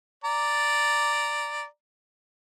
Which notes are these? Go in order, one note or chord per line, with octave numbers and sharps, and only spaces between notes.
D5 A#5